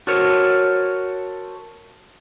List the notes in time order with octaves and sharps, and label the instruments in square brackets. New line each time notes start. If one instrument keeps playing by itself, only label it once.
[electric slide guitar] F#4 A4 A#4 C5 C#5